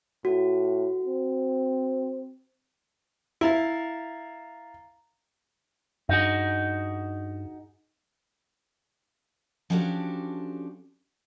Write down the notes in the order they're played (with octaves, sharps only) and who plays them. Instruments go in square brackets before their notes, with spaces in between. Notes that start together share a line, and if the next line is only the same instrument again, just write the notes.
[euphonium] A2 [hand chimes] F#4
[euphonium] C4
[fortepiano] E4 [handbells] F5 A#5 A6
[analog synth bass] G2 [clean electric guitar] D#4 F#4 G#4
[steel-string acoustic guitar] F3 C#4 D4 F#4 G4 A4